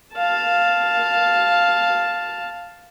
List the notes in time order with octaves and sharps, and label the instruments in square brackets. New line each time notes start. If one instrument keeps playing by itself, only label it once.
[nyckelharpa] F5 A5